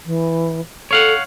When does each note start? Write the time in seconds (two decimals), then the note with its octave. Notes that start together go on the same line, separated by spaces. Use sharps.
0.05 E3
0.91 A4 C#5 F5 F#5